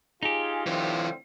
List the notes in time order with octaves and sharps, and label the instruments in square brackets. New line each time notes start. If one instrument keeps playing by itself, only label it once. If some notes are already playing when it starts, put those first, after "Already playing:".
[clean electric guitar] D#4 G4 [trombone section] F4 G#4
[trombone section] A2 D3 C4 [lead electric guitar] E3 F4